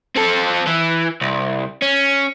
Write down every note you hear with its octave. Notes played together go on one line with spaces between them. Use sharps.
C4 A4
E3
C2
C#4